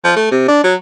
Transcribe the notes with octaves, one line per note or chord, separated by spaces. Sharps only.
F3
A3
C3
D4
F#3